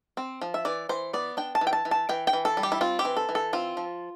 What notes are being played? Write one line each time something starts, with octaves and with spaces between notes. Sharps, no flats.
C4
F3
E5
E3 D5
E3 C5
B3 D5
D4 G5
A5
E3
G5
A5
E3
A5
E3 G5
G5
E3
A4
G3
G4
E4
C4 F4
G4
E3
A4
E3
A4
C4 F4
F3